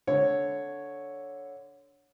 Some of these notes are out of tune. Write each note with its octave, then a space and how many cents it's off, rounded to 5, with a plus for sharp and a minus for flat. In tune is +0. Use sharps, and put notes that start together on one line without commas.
D3 -5 C#5 +0